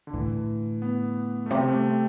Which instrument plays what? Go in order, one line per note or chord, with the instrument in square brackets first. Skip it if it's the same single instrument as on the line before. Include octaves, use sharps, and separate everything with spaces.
[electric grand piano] D3
[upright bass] A2 [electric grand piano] E3
[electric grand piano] B3
A3
[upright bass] C3 [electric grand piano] G3
[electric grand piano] A3
C4